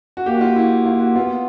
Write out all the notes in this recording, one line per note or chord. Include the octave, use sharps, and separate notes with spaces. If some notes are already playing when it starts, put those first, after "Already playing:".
F#4
A#3 G4
F#4
F4
E4
F4
F#4
B3 F4